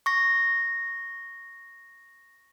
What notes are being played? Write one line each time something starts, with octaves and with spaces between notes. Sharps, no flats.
C#6 A#6